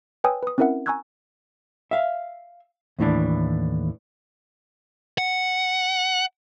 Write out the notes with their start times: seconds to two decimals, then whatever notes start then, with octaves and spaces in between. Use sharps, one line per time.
0.24 B4 C#5 G5 G#5 D#6 E6
0.43 B4 D#6
0.58 C4 C#4 E4 A#4 E5 F#5
0.86 G#5 A#5 C#6 E6 F#6 G#6
1.91 E5 F5
2.99 D#2 A2 E3 D4
5.18 F#5